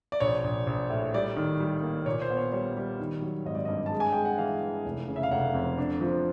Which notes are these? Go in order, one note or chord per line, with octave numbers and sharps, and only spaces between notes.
D5
A#1 C#5
A#1
A#1
A2
G3 D5
D#3
G3
A#3
A#2 C#5
C5
B3
C#5
G3 C#5
G3
D#3
F#3
G#1 D#5
D5
G2 D#5
A5
G#3
G#5
G#3 G5
F#5
E3 F5
E3
F1
C#3
E5
F5
F1 F#5
F2
D4
F3